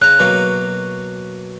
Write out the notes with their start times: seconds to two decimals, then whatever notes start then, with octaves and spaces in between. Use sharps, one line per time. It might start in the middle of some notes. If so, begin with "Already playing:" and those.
0.02 C#3 A#5 F#6
0.19 B2 F#3 A#3